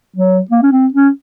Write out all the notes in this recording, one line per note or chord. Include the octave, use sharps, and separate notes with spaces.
F#3
A#3
C#4
C4
C#4